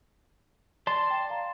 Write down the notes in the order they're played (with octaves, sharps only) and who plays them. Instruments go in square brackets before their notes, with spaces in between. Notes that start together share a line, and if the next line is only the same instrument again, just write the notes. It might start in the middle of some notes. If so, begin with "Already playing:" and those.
[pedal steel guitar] D5 A5 C6
[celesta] G5
F5 A#5